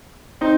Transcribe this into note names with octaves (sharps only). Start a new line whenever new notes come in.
C4 D#4